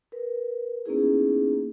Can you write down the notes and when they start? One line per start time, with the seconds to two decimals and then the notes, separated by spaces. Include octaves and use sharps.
0.12 A#4 B4
0.86 A#3 B3 C#4 D#4 E4 G#4